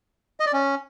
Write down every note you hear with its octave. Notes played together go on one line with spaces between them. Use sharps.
D#5
D5
C#4